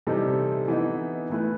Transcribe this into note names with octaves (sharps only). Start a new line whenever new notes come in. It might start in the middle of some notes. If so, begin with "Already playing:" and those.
C3 E3 G3 D#4 A4
E3 B3 D#4
E3 A3 E4 B4